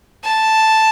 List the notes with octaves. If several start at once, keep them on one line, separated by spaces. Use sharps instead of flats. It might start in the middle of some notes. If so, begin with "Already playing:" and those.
A5